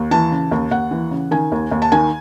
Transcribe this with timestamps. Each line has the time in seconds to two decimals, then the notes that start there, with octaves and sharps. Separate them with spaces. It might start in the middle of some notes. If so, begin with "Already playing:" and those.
Already playing: D#2
0.11 E3 A5
0.32 C#3
0.51 D#2
0.71 D#2 F#5
0.91 E3
1.11 C#3
1.31 D#3 G#5
1.52 D#2
1.71 D#2
1.82 A5
1.92 D#3 G#5